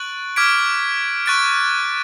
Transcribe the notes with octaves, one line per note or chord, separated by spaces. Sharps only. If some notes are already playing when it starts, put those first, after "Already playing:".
Already playing: C#6 F#6 A6 D7 F#7
D6 F6 G#6 B6 D7
C#6 F#6 A6 D7